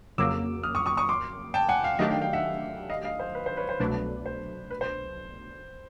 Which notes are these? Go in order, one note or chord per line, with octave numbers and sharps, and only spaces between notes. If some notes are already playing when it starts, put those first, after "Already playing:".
F2 C#3 F#3 A#3 D6 E6
D#6 F6
C#6 D#6
C#6 D#6
C#6 D#6
C6 D6
G5 A5
F#5 G#5
F5 G5
D#3 F#3 A3 D4 G4 D#5 F5
F5 G5
F5 G5
E5 F#5
D#5 F5
D#5 F5
C5
B4
C5
B4 C#5
C5
C2 B2 F#3 A3 D4 B4
C5
B4
C5